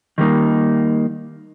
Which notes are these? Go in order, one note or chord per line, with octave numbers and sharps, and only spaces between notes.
D#3 G3 A#3 D#4